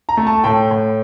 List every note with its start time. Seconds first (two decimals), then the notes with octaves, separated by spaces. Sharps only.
0.09 A#5
0.17 A3
0.27 A5
0.44 A2 G5
0.71 A2